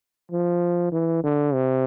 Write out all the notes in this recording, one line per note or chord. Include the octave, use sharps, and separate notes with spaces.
F3
E3
D3
C3